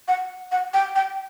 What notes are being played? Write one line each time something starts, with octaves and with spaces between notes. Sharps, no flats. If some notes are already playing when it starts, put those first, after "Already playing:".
F#5
F#5
G5
G5